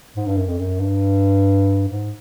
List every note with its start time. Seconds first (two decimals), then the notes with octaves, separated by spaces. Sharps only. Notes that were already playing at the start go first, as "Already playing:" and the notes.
0.16 G#2
0.26 G2
0.37 F#2
0.47 F2
0.59 F#2
0.80 G2
1.89 G#2